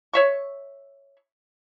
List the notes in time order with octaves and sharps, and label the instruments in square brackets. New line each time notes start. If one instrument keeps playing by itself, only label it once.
[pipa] C#5 E5 C#6